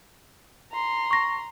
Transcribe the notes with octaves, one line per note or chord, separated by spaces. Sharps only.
A#5 C6
C#6 A#6